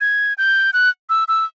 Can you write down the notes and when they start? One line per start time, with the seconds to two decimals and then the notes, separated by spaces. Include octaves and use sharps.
0.01 G#6
0.38 G6
0.73 F#6
1.10 E6
1.28 E6